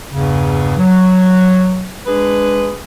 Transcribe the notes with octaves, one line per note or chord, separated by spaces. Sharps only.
E2 G2 C#3
F#3
G#3 D4 G#4 B4